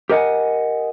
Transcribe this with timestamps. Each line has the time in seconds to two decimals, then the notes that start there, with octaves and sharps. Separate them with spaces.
0.09 G4 A#4 D#5 F#5 G#5